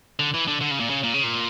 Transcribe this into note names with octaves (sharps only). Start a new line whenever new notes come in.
D3
E3
D3
D3
C#3
A#2
C#3
A#2
C#3
A#2